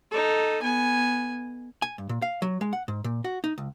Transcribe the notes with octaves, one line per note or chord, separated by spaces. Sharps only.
D#4 A4
B3 G#5
G#5
G2
A#2
F5
F#3
G#3
F#5
G#2
A#2
F#4
D#4
C#2